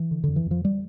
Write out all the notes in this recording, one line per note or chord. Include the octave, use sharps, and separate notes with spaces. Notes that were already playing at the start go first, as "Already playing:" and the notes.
Already playing: E3
D3
F2 D3
E3
F2 F3
G3